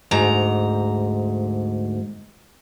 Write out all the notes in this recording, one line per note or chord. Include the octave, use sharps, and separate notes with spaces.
D2 G#2 A#5